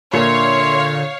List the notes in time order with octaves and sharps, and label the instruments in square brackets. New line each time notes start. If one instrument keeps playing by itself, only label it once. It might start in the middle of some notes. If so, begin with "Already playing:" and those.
[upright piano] A#2 [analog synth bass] D3 [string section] C#5 F5 [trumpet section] E5 C6